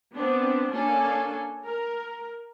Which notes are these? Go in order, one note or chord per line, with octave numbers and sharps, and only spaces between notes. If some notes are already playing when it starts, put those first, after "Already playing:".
B3 C4 D4
A#3 C#4 D4 A4 G#5
A#4